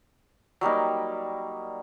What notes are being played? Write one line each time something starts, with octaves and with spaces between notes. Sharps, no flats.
F#3 G3 A#3 D#4